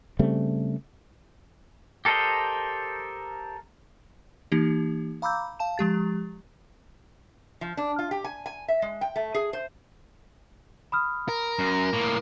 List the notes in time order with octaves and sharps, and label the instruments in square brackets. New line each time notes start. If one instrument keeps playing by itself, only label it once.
[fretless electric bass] C#3 G3 A3 C4
[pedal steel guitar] G4 A4 A#4 C5 D#5
[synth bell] E3 A#3 D#4 G4
F5 A#5 B5 D6 E6 G6
F5 A5 E7
F3 G#3 G4 A6
[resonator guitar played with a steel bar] F3
D4
F4
G4
G#5
G#5
E5
G#3
G5
A3
G#4
C5
[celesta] B5 D#6 F6
[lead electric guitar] A#4
[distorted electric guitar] F#2
A2 A#3